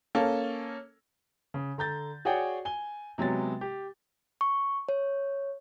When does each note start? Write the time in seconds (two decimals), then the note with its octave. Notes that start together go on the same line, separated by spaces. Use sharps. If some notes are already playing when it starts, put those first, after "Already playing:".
0.15 A#3 C#4 A4
1.54 C#3
1.78 D3 A#5 G6 A6
2.25 F#4 G#4 C#5 D5 F#5 G5
2.65 G#5 G7
3.18 C3 F#3 G#3 B3 A6
3.61 G4
4.41 C#6
4.89 C#5